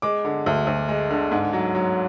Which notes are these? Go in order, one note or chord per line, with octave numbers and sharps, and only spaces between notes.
G#3 D6
D3
D2
D2
G#3
D3
G#2
F#3
F#3